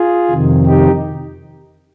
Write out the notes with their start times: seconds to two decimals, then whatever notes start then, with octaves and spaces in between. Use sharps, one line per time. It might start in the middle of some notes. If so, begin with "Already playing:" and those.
Already playing: F4 G#4
0.30 F2 C3 D#3
0.66 D#4 G4